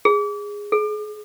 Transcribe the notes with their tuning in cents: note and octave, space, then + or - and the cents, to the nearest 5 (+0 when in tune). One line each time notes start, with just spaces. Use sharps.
G#4 -15
G#4 +35